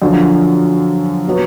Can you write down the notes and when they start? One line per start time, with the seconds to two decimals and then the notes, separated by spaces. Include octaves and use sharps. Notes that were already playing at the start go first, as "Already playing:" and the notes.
0.02 F#2 D3 F3
1.26 B2 F#3 B3